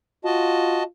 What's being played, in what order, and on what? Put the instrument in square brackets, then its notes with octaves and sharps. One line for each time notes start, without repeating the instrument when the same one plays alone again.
[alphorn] F4 [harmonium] F#4 D#5 A5